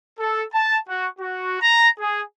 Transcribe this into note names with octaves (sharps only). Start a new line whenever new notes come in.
A4
A5
F#4
F#4
A#5
G#4